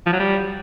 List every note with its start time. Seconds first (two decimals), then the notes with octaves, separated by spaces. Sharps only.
0.06 F3
0.13 F#3
0.20 G3